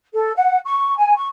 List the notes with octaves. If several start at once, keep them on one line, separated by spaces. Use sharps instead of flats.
A4
F#5
C#6
G#5
C#6